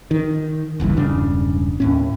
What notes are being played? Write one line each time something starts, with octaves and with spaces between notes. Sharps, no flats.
D#3
F1 C#2 G2 E3
E1 G2 C#3 D4
D#2 A2 C#4